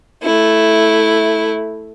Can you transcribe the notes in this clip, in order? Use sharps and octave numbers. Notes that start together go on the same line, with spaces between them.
A3 E4